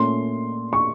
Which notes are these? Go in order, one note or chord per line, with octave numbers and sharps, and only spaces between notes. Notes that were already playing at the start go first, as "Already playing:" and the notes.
Already playing: A#2 A3 C#4 C6
C#6